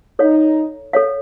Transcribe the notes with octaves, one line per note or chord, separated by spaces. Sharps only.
D#4 A4 C#5 F5
A4 C#5 F5